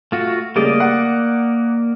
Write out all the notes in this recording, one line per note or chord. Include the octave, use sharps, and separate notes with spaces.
A3 F4 F#4
C#3 G3 A3 A#3 D5 D#5
F#5